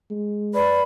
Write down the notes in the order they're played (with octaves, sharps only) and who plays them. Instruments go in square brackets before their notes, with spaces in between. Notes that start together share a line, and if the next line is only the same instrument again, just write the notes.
[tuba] G#3
[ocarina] B4 [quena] D5 [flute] B5